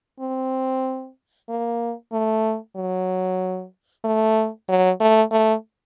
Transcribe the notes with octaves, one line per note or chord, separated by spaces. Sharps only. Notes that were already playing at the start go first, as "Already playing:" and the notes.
C4
A#3
A3
F#3
A3
F#3
A3
A3